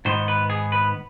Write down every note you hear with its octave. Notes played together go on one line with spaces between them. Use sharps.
G#2 D#3 B3 C5
B4
G#4
B4